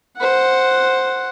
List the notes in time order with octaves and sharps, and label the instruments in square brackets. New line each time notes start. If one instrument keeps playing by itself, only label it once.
[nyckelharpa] C5 F#5